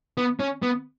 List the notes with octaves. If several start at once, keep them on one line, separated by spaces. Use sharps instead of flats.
B3
C#4
B3